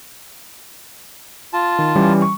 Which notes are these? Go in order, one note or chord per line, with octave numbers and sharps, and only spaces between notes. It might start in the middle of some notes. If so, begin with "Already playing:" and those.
F4 A5
D#3
E3 G3 C#4
C#6